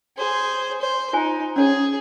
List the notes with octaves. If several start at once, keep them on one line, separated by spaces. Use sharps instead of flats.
G#4 C5
C5
D#4 F4 C5 G#5
C#4 G#4 C#5